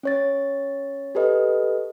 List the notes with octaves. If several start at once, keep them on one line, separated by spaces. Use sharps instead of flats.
C#4 C#5 A6
G4 A4 B4 D#5